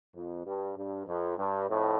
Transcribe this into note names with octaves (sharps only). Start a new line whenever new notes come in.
F2
G2
G2
F2
G2
F2 A2